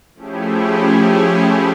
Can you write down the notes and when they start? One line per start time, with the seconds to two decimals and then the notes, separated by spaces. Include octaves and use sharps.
0.15 F3 A3 C#4 E4 G4 G#4